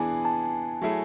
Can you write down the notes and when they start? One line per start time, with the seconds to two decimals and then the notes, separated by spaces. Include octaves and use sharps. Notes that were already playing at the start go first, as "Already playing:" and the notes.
Already playing: E3 B3 D4 G#4 G#5
0.25 A5
0.82 F#3 A3 E4 G#4